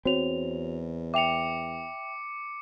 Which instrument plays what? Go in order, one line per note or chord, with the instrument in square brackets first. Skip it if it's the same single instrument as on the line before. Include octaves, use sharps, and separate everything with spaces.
[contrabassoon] E2 [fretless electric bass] C4 [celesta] F#4 C#5 F7
[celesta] E5 G5 F7 [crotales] D6 C#7